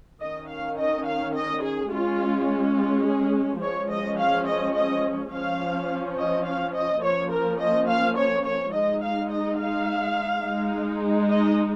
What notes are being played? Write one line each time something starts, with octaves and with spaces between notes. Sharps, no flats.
D#3 C#4 D#5
F5
D#5
F5
D#5
G#4
G#3 C#4 F4
F4
G#4
F3 G#3 C#4 C#5
D#5
F5
D#5
D#5
F3 C#4 F5
D#5
F5
D#5
F3 A#3 C#4 C#5
A#4
D#5
F5
C#5
C#5
G#3 D#4 D#5
F5
D#5
F5
G#3 D#4
D#5